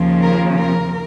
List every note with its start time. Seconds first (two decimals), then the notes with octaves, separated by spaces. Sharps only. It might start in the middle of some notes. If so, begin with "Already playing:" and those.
Already playing: D#2 C#3 F3
0.22 A#4
0.56 A#4